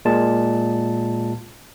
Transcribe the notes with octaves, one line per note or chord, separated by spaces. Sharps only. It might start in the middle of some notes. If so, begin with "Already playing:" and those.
A#2 G#3 A5